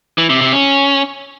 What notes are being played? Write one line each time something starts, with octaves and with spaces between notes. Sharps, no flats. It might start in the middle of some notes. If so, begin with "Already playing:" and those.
E3
C3
C3
C#4